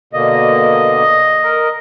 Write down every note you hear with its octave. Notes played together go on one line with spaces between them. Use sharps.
B2 D3 A#3 D#5
A#4